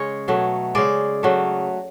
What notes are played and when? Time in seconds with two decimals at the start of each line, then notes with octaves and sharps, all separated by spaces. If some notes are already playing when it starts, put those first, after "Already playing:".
Already playing: C#3 G#3 C#5
0.28 B2 F#3 A3
0.75 C#3 G#3 D5
1.23 C#3 F#3 A3